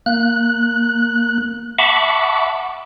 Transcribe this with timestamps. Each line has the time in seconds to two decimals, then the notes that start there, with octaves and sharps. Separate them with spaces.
0.06 A#3 F#6
1.78 E5 F#5 A5 B5 C#6 D6